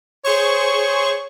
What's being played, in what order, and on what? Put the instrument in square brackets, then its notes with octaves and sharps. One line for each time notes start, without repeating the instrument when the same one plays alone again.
[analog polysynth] G#4 C5 C#6 [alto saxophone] C#5